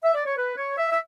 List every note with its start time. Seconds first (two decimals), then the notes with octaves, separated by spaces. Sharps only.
0.03 E5
0.14 D5
0.25 C#5
0.37 B4
0.57 C#5
0.77 E5
0.91 E5